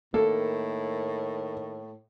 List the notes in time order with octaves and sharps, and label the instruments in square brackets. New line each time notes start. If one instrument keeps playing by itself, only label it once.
[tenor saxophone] A2 [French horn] D#3 [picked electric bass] A#3 [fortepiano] A4